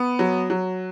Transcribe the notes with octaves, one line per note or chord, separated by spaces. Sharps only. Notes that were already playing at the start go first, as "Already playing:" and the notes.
Already playing: B3
F#3
F#3